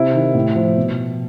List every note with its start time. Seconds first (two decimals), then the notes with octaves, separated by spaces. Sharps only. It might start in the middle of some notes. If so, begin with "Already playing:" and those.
Already playing: C3 E4
0.14 D#3
0.35 A2
0.55 F3
0.77 B2